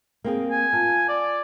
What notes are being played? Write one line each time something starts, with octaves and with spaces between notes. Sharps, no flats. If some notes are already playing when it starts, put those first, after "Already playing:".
A#3 C4 G#4
G#5
F4 A5
D5